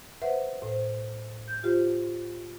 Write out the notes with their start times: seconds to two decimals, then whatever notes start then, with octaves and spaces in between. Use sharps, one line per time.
0.22 B4 C5 E5 F#5
0.62 A2 C5
1.48 G6
1.63 F4 G4 C5